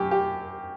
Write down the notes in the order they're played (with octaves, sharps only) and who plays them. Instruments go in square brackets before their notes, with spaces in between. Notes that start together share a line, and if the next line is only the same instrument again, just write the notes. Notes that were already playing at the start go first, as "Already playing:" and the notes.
Already playing: [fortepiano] F#2 G4
G4